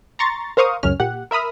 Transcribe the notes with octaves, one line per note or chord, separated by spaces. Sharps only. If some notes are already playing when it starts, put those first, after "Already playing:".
A#5 C6 C#6 A6
A#4 C5 F5 C#6 D#6
C#2 F#2 C#4 F6
A#2 G4 F#5
A#4 E5 B5 D#6 F6